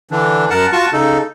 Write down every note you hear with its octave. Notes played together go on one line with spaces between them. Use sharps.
D3 E3 D4
F#2 A#4 F#5 A5
F4 F#4 A5 C#6
C#3 D#4 A4